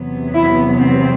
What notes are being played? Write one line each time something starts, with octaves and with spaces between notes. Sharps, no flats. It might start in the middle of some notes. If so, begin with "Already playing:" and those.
Already playing: E2 C3 F#3 B3
E4
C4